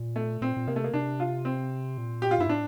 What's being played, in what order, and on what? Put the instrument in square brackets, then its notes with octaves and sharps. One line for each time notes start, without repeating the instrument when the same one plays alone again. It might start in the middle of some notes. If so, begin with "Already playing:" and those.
Already playing: [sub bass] A#2
[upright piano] A3
[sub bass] A#2 [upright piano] C4
[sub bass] A#2
[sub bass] C3 [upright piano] A#3
[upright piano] A3
A#3
[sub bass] C3 [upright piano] D4
[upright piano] F4
C4
[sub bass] A#2
[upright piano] G4
F4
[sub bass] G2 [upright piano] E4
[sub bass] A2 [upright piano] D4